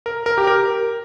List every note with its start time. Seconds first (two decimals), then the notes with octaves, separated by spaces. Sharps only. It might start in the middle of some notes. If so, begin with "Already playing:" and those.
0.06 A#4
0.26 A#4
0.38 G4
0.47 A#4